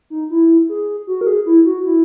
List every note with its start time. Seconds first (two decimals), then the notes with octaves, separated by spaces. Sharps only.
0.10 D#4
0.30 E4
0.69 G#4
1.07 F#4
1.21 A#4
1.27 G#4
1.46 E4
1.65 F#4
1.85 E4